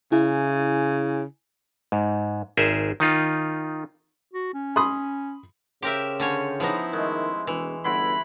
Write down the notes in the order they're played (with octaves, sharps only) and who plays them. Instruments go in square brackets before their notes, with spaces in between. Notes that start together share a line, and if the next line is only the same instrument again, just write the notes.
[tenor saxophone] C#3 [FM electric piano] E4 G#5
[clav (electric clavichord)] G#2
G#1 G#4 A#4 C5 E5
D#3 D#4 F4
[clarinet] F#4
C#4
[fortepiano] B5 C6 D#6
[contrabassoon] C#3 [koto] G4 A#4 E5 [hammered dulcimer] C5 G5
[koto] D3 C#4 C#5
[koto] F3 B3 D#4 [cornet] E4
[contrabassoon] D#3 [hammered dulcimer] G#3 A3
[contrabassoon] E1 [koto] E3
[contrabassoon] G1 [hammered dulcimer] E4 F#4 C6 [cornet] B5